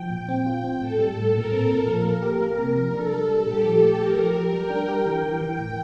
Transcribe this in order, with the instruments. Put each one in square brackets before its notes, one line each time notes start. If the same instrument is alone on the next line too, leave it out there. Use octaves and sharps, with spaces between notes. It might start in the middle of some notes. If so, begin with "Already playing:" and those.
Already playing: [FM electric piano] F3 [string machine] G5
[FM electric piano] A#2
[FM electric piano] C4 [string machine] G5
[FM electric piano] F4
C4
[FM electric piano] A2 [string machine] A4
[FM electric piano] G3
A2
[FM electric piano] A#2 [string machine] A#4
[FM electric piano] C4
A#2
F3
A#3
G4
A#3
C3
F3
[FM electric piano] D4 [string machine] A4
[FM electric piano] G3
G3
[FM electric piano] A#2 [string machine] G4
[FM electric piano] F3
A3
[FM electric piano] G4 [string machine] A#4
[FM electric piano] F3
G4
[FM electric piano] G3 [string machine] G5
[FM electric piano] D4
G4
[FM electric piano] E3 [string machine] G5
[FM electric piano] E3
E3
A2